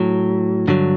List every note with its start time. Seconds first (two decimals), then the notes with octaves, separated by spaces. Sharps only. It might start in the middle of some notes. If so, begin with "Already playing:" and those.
Already playing: A2 F#3
0.68 G2 D3 F#3